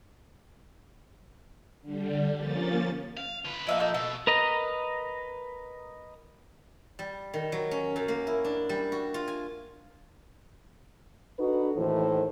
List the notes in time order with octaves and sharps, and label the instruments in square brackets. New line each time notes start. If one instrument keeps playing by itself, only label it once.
[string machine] D3 G3
F3 A#3 C#4 A6
[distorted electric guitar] F5
D3 B4
[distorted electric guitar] F3 A#3 [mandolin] D#4 E5 F5
[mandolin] D#4 A4 E6
[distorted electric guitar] B2 [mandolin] A4
[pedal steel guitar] A#4 B4 D#5 A#5
[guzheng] G3
D#3
F#3
C#4
F#2
A#3
E4
D4
G3
F#4
F4
G#5
[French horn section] D4 D#4 F#4 A4 B4
D#2 A2 D#3 E3 A3 C5